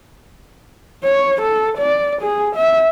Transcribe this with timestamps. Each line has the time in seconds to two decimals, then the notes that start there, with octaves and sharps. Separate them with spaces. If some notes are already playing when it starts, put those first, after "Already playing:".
1.04 C#5
1.42 A4
1.78 D5
2.22 G#4
2.56 E5